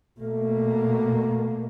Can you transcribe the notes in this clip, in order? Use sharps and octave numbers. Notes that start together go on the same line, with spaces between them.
B2 A3 A#3